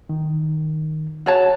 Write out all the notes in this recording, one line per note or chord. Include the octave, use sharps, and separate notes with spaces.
D#3
F#4 C#5 A5